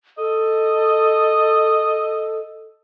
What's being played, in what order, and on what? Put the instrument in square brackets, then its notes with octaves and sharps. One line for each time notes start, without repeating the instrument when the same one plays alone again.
[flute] A4 [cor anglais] D#5